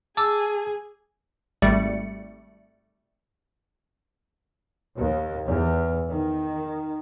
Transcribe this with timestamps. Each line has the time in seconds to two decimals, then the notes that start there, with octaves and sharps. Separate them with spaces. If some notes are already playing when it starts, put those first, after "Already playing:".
0.17 G#4 A5 D6 E6
1.62 G#1 G3 A3 D5 C#7
4.96 D#2
5.45 E2
6.09 D#3